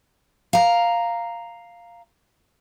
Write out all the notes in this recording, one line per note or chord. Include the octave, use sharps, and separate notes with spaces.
F5 A#5